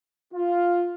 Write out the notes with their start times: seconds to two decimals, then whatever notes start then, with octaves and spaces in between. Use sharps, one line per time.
0.33 F4